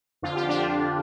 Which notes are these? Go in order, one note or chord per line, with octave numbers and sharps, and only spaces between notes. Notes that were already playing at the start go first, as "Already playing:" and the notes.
F2 D3 F3 F4
G4
D4 F4